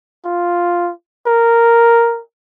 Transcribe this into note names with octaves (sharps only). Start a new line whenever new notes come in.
F4
A#4